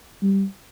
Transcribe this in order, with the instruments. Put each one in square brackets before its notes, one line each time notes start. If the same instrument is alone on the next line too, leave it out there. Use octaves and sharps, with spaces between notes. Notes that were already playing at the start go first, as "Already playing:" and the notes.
[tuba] G3